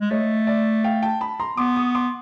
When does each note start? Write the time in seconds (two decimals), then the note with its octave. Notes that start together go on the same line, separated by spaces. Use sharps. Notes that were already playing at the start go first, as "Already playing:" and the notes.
0.01 G#3
0.11 A3 C#5 D#5
0.47 D5 E5
0.84 F5 G5
1.03 G5 A5
1.21 A5 B5
1.40 A#5 C6
1.57 B3 C6 D6
1.76 C#6 D#6
1.95 C6 D6